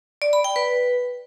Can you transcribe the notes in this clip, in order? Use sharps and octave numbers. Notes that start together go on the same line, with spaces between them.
D5
B5
G5
B4